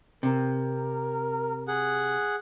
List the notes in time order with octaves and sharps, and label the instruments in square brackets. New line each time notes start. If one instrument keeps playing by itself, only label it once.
[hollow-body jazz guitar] C3 [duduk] A#4
[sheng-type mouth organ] G#4 F#5